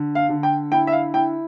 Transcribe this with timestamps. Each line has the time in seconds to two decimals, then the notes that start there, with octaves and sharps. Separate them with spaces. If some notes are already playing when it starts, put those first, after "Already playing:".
Already playing: D3
0.15 F5
0.29 D3
0.43 G5
0.72 E4 G5
0.87 E5
0.92 F5
1.14 E4 G5